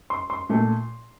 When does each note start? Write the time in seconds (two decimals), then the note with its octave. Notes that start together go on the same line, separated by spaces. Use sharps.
0.10 C6
0.30 C6
0.49 A#2 A3